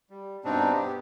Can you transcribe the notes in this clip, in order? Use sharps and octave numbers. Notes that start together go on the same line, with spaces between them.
G3
G2 B2 C4 D4 D#4
B3 G4